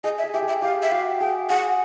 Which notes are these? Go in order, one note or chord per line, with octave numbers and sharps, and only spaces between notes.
G#4 D#5
E5
G#4
G4 E5
G#4
E5
G4 F5
E5
F#4 F5
G#4 G5
G#4 F#5